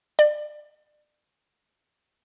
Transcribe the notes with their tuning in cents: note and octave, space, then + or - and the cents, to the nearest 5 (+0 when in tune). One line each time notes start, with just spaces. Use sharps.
D5 +35